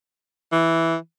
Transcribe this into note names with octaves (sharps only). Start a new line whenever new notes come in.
E3